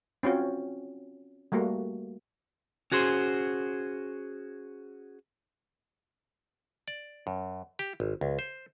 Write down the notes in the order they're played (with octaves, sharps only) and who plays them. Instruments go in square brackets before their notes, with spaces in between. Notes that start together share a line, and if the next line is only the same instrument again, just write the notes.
[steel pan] C4 C#4 F4 F#4
G3 A3 A#3 F#4
[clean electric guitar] C#4 F#4 G#4 C5
[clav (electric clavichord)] D5
F#2
G4
G#1
C#2
C5